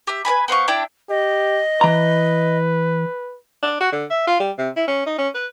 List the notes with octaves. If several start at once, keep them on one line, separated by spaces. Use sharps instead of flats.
G4 E5
B4 D5 G#5 B5
B3 C5 F5 C#6
D4 E4 D5 G5
G4 D#5
E3 B4 A#5
D4
F#4
D3
E5
F4
G3
C3
E4
C#4
D#4
C#4
B4